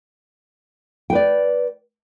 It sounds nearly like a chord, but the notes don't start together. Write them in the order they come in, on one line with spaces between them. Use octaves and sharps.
G5 B4 D5